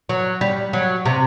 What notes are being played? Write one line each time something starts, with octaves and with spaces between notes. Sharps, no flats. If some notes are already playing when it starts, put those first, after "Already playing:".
F#3
G3
F#3
C3